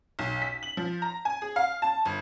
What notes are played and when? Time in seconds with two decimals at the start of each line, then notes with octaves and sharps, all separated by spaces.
0.19 B1
0.42 B6
0.63 F#7
0.77 F3
1.02 A#5
1.25 G#5
1.42 G#4
1.56 F5
1.82 A5
2.05 G1